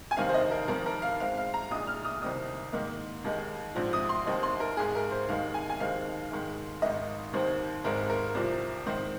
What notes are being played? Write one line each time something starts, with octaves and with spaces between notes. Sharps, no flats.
G#5
F1 D#2 D#3 C4 D#4 F5
C5
D#5
A#4
F2 D#3 C4 A#4
A#4
F5
G#2 G#3 C4 F5
F5
A#5
A#1 A#2 G#3 D#4 D#6
F6
D#6
C2 C3 D#3 C4 D#4 D#6
G#2 D#3 A#3 D#4
D#2 D#3 G#3 D#4
A#1 G#2 F3 C4
D#6
C6
D#2 D#3 C4 D#4
C6
A#4
G#1 G#2 G#3 G#4
A#4
C5
D#2 D#3 G#3 D#4 F5
G#5
G#5
D#2 D#3 G#3 C4 D#4 F5
G#2 D#3 G#3
G#1 G#2 D#3 D#5
D#2 D#3 C4 C5
G#1 G#2 G#3 C4 A#4
A#4
C2 C3 F3 C4
G#2 D#3 C4 D#4 C5